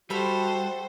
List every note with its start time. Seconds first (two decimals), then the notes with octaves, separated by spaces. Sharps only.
0.10 G3 F#4 G4 A4 C5 E5 B5